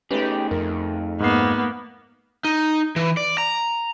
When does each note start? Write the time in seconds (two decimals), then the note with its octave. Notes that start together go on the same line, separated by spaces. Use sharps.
0.11 A3 C#4 D#4 G4 G#4 B4
0.51 F2 A#4
1.20 G#2 A#3 B3 C7
2.44 D#4
2.96 E3
3.17 D5
3.38 A#5